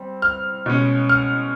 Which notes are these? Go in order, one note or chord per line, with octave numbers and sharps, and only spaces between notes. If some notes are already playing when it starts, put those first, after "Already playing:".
Already playing: G3 C4
F6
B2 G#3 C#4
F6